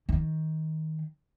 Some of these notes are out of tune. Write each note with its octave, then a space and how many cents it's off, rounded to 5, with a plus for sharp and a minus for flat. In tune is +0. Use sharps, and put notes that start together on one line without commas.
D#3 +20